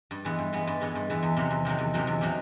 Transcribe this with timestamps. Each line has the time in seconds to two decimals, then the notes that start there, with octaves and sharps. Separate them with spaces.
0.11 G2
0.25 E3 G#3 B3
0.39 G2
0.53 E3 G#3 B3
0.67 G2
0.80 E3 G#3 B3
0.95 G2
1.10 E3 G#3 B3
1.23 E2
1.37 C3 D#3 F#3
1.50 E2
1.65 C3 D#3 F#3
1.79 E2
1.94 C3 D#3 F#3
2.07 E2
2.21 C3 D#3 F#3